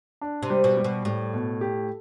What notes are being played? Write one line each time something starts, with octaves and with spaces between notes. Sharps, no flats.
D4
C3
G3
B2
G3
B2
A2 G3
B2
G4